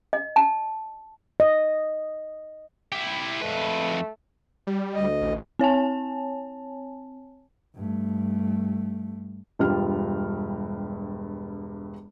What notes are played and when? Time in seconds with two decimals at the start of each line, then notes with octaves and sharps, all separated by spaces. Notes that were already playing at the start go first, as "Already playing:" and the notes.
0.13 D#5
0.36 A5
1.40 D#5
2.92 E4 G4
3.41 F2 A3 B4
4.67 G3
4.94 D2 D#5
5.22 A1
5.59 C4 C#5 G#5 A5
7.75 G2 A3
9.59 E1 G2 G3 F4 F6